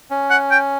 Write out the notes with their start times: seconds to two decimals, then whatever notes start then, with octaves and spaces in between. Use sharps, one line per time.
0.10 C#4
0.30 F#5
0.51 G5